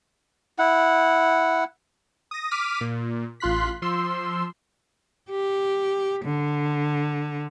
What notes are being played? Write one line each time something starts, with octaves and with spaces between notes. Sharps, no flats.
E4 F#5
D#6 A#6
D6 F6 B6 D#7
A#2
A1 F4 C6 F#6 B6
F3 C6 E6
G4
D3